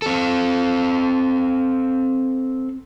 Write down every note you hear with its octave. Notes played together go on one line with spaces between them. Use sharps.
C4 A4